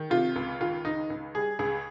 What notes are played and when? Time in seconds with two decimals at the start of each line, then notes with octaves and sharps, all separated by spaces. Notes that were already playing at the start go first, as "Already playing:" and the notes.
Already playing: D#3
0.10 C3 F4
0.36 C#2
0.61 D#3 F4
0.85 C#2 D#4
1.10 C#2
1.35 G3 G#4
1.59 C#2 G#4